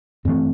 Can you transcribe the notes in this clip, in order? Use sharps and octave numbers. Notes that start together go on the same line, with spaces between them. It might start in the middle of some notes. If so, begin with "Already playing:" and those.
G2 E3 A3 C4